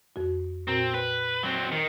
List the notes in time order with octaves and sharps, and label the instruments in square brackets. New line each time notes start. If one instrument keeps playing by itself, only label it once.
[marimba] F2 F#4
[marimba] A#2 F#4 A#5 [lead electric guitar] C4
[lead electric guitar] B4 [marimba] G5
[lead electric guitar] F#3 C4
D#3